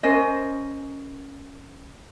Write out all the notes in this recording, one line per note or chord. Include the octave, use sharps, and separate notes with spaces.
C#4 A#4 C5 D#5